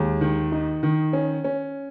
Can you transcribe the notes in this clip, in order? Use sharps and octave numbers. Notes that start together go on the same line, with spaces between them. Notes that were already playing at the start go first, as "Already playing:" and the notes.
Already playing: D#2 G#3
D#3
D#4
D#3
C#4
C#4